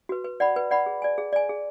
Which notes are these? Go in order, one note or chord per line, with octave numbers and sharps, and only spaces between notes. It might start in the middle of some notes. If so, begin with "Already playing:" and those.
F#4 B4
B4
D5 F#5 B5
B4
D5 F#5 B5
G#4
D5 G#5
G#4
D5 G#5
G#4